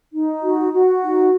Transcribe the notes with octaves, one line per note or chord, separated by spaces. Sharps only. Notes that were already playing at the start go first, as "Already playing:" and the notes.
D#4
F#4
F#4
D#4